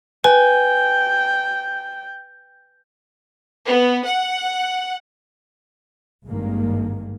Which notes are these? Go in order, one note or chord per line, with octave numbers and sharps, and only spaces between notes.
B4 G5 G#5
B3
F#5
G#1 G2 D#3 G#3 A#3